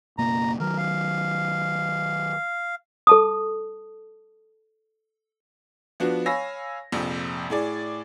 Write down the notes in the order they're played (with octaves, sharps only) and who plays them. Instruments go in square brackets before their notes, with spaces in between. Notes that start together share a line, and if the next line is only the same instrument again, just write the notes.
[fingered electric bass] F#1 B2 A#3 [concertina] A#5
[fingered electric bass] D#3 F#3 [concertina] A#4
[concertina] F5
[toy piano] A4 A5 D#6
[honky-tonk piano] F3 B3 D4 F#4
C#5 F5 G#5 B5 E6 A#6
A#1 F2 C3
A2 G#4 D5